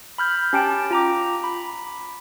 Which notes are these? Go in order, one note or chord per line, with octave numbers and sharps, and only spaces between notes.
B5 F6 G6
C#4 G4 G5 A5 D7
F4 A#5 D6
B5